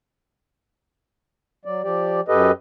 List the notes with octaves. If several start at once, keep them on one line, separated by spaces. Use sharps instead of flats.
F#3 D5
F3 G4 D5
F#2 G4 A4 B4 D#5